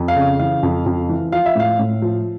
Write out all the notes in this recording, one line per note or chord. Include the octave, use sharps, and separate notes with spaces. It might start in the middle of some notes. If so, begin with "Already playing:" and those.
Already playing: F2
F5
C#3
E3 F5
F2
F2
E3
F3 F5
E5
A2 F5
A2
F3